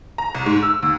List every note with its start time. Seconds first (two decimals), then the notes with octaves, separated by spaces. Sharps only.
0.18 A#5
0.35 C2
0.46 G#2
0.63 E6
0.83 D#2